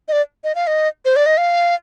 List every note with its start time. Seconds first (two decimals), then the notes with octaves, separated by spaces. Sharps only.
0.08 D#5
0.12 D5
0.44 D#5
0.55 F5
0.67 D#5
1.05 C5
1.16 D5
1.26 D#5
1.38 F5